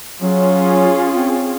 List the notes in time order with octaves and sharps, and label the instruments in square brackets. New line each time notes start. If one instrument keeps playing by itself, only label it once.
[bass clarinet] F#3 [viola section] C#4 F4 G#4
[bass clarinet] C4